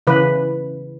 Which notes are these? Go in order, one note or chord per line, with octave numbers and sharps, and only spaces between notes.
C#3 E3 B4